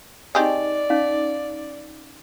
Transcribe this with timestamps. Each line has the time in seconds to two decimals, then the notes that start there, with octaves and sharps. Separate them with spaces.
0.35 C4 D#4 G4 G#4 D5 D#5 C#6
0.90 C#4 D#4 F5